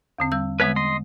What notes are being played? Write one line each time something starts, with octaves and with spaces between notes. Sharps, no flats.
E2 D3 C4
G3 E6
D3 G#3 B3 B4 C#5 E5
D#5 C6